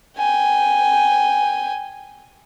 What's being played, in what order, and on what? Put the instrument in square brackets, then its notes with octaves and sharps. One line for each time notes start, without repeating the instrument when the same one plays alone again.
[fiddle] G5 G#5